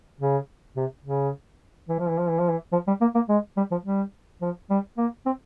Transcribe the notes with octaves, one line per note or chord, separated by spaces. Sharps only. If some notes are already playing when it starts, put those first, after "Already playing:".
C#3
C3
C#3
E3
F3
E3
F3
E3
F3
E3
F3
G3
A#3
A#3
G#3
G3
F3
G3
F3
G3
A#3
C4